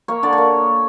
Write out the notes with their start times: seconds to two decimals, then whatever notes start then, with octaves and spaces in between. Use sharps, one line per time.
0.08 A#3 C#5
0.23 D3 D5
0.33 C#5
0.38 A#3